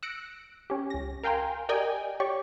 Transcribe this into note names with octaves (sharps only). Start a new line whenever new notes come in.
E6 F#6 A#6 C#7 D7
C#4 G4
C#2 A#6
A#4 F5 G5 G#5 A#5 C6
G4 A#4 D5 D#5 G5 G#5
G4 C#5 D5 C#6